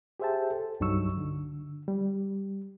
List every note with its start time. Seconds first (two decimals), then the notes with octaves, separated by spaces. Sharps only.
0.20 G4 G#4 C5 E5 G5 A5
0.51 A4
0.80 C2 G2 F#3 D#4 C#6 E6
1.17 D3
1.88 G3